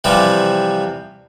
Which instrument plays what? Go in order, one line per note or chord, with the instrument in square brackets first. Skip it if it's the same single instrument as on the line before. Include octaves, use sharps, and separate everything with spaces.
[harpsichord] C3 E3 F3 G3 D6